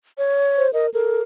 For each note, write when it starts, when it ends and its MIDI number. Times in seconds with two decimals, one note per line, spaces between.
0.18 0.67 73
0.57 0.73 72
0.73 0.90 70
0.73 0.86 75
0.94 1.21 69
0.94 1.23 70